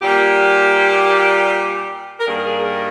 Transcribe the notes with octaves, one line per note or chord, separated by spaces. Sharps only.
A#2 G3 A#3 G4
A#4
G2 D#3 G3 A#3 G#4
G#4
A#4